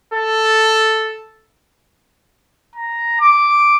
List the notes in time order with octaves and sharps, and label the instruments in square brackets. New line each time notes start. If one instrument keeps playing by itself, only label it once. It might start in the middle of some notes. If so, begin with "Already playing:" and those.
[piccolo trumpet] A4
A#5
D6